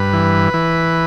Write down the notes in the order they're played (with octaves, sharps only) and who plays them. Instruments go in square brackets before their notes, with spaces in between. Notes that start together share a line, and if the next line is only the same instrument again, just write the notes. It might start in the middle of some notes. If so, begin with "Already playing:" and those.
Already playing: [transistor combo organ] G2 B4
E3
E3